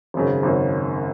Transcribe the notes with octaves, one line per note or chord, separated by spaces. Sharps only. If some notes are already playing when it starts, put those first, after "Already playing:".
G#1 F#2 C#3
G#1 F#2 C#3